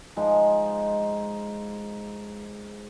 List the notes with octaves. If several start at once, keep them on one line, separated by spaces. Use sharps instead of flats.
F3 G#3 D#4